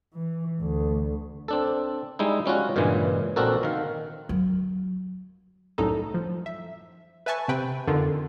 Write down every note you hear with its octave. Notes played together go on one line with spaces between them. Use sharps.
E3
D2
C4 D4 A4
G3 G#3 D#4 E4
G3 C#4 F4 F#4
G2 A#2 C#3 E3 G#3
A#1 C4 D4 F#4 A4 A#4
D#3 F5
F#3
C2 F#2 A2 D#4 A4
F3
E5
B4 E5 G#5 A5 C#6
C3 C4 B4 G5 B5
F2 D3 D#3 F4